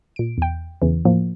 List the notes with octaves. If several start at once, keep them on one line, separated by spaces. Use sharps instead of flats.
A#2 D7
E2 G5
E2 C#3 E3
A2 F3 A#3